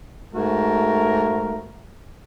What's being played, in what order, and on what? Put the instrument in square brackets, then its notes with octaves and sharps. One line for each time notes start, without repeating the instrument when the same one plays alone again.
[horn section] G#2 A3 F#4 A#4